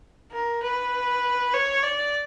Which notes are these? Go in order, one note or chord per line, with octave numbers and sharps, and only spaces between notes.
A#4
B4
C#5
D5